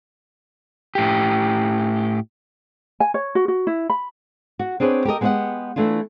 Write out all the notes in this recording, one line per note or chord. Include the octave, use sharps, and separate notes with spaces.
A2 G4
G#5
C#5
F#4
F#4
E4
B5
F#4
C4 D4 G#4 B4 C#5
G4 A4 A#4 D#5
G#3 B3 G4 C5 D#5 F#5
E3 A3 D4 E4 F4